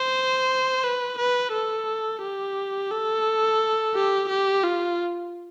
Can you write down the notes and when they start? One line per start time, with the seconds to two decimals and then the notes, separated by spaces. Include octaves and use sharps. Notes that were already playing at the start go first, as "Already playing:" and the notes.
Already playing: C5
0.84 B4
1.18 B4
1.53 A4
2.22 G4
2.91 A4
3.95 G4
4.29 G4
4.64 F4